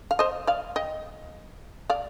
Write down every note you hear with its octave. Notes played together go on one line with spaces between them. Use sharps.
F5
C5 D#5
D5 F5
D#5 G5
D5 F5